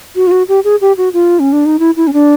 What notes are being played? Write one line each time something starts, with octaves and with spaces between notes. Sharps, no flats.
F#4
F4
F#4
G4
G#4
G4
F#4
F4
C#4
D4
D#4
E4
E4
C#4
D4